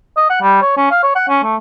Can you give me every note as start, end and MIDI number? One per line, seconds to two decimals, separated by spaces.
0.17 0.26 75
0.30 0.39 78
0.42 0.57 55
0.62 0.77 73
0.77 0.89 61
0.91 0.99 77
1.03 1.13 73
1.16 1.25 78
1.29 1.39 61
1.43 1.56 57